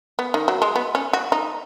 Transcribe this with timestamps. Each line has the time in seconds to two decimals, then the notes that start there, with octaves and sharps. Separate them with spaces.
0.19 B3
0.34 D#3
0.48 F#3
0.62 G#3
0.76 B3
0.95 C#4
1.13 F#4
1.32 D#4